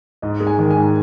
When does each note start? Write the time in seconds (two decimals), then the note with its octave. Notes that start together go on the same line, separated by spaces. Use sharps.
0.22 G#2 D#5
0.40 G#3
0.47 G#5
0.59 D#3
0.71 G#5
0.76 G#2